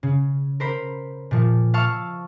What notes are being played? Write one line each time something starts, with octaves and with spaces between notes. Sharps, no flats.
C#3
A#4 C5 B5
A#2 F3
F5 A5 C#6 E6 F6